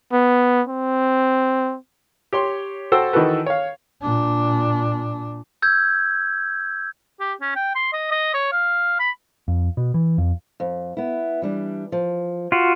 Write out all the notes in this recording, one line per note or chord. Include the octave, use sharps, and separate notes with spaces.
B3
C4
G4 C#5 C6
F#4 A4 C5 G5 E6
D#3 E3 F#4 A4 B4
C#5 F5
A#2 D4
E6 G6 G#6
G4
C#4
G5
C6
D#5
D#5
C#5
F5
B5
F2
B2
E3
F2
F2
B3 E4
E3 G3 D4
F3
F4 F#4